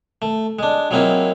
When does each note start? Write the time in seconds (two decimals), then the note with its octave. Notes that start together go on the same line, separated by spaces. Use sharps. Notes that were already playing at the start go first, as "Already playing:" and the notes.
0.22 A3
0.59 G#3 D4
0.91 F#3 G#3 A#3 C4 E4 F4